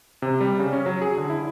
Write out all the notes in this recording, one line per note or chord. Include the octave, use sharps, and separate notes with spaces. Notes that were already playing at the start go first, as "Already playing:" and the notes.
C3
G3
C#3
C#4
F#3
G#4
D3
E4